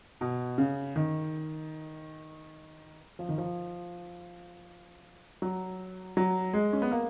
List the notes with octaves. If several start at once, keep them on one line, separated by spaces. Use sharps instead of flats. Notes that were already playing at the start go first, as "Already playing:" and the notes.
B2
C#3
D#3
F3
D#3
F3
F#3
F#3
G#3
C#4
B3
A#3